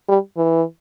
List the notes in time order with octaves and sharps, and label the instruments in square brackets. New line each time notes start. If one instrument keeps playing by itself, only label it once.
[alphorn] G3
E3